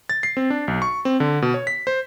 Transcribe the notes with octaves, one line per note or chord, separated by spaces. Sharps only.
A6
C7
C4
D4
B1
C#6
C4
D3
B2
C#5
B6
C5